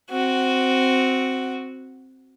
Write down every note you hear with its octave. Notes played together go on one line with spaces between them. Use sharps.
C4 F#4